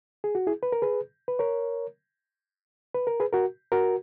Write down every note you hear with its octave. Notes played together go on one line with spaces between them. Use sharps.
G#4
F#4
E4 G#4
B4
A#4
G#4 B4
B4
A#4 C#5
B4
A#4
G#4 B4
F#4 A#4
F#4 A#4